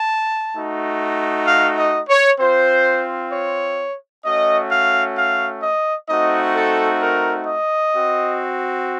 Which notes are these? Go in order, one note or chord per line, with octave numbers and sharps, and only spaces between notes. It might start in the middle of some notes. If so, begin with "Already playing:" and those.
Already playing: A5
A3 D#4 F#4
F5
D#5
C#5
C4 F4 C5
C#5
A3 C#4 F#4 D#5
F5
F5
D#5
A3 C4 D#4 F#4 D#5
A4
A#4
D#5
C4 F#4